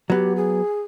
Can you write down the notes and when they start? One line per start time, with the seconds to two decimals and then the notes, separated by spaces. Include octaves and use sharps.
0.10 F#3 B3 G4
0.36 G#4